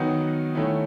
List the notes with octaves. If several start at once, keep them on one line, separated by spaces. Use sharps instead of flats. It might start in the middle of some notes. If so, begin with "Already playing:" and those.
Already playing: D#3 F#3 B3 D#4 F#5
D#3 A3 C#4 E4